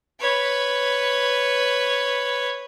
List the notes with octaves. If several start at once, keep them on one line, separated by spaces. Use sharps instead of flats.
B4 C#5